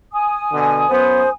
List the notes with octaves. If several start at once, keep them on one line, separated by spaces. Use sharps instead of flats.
G#5 D#6
B2 D3
F#2 B3 C5